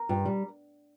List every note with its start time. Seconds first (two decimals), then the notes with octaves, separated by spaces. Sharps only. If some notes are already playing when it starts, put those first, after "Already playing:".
Already playing: A#4
0.09 G2
0.25 G3